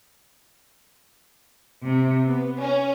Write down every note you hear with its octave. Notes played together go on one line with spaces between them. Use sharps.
C3
B3
C#4